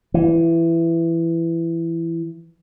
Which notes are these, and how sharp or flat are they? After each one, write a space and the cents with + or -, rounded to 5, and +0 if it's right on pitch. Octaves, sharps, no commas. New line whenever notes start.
E3 +15